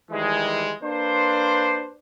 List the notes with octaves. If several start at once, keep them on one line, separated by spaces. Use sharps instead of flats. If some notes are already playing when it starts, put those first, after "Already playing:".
D#3 E3 G3 G#3
A#3 D4 B4 C5